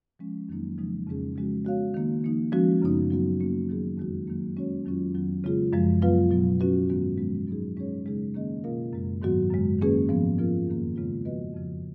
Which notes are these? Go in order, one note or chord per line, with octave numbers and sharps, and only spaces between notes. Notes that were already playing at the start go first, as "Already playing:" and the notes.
F3 G#3 C#4
F2 D#3 F#3 A#3 D#4
C#3 F3 G#3 D#4
F2 C#3 G#3 C#4 G#4
C#3 F3 G#3 C#4 F#4
G#3 B3 F#4 C#5 F5
D#3 A#3 D#4
F3 A#3 D#4
F3 G#3 C#4 F#4
F#2 C#3 F3 B3 D#4
F#3 B3 F#4
A#3 C#4 F#4
D#3 F#3 B3 D#4 G#4
F2 D#3 G#3 D#4 F#4
D#3 F#3 A#3
G#3 C#4 F#4 C#5
F2 D#3 F#3 C#4 F4
F2 D#3 F#3 B3
C#3 G#3 B3 F4 G#4
F#2 F3 G#3
F#3 B3 F4 B4 F5
B2 F#3 B3
F#3 C#4 F#4 B4
G#2 D#3 G#3 B3 F#4
F3 G#3 B3
F#3 B3 D#4 G#4
G#3 C#4 G#4 C#5
C#3 G#3 D#4 G#4
D#3 A#3 C#4 G#4 D#5
B2 A#3 F4 A#4 F5
F#2 C#3 G#3
G#2 D#3 F#3 B3 F#4
F#2 C#3 G#3
D#3 A#3 C#4 G#4 B4
G#2 F3 B3
F3 B3 F4 A#4
F2 D#3 A#3
C#3 G#3 B3 F4
F3 B3 F#4 B4 D#5
F2 C#3 F3